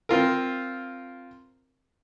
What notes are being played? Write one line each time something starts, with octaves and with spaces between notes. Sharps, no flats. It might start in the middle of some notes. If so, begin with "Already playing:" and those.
C4 F4 A#4